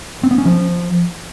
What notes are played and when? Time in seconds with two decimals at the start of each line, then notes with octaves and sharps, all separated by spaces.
0.23 C4
0.31 B3
0.38 C#4
0.45 F3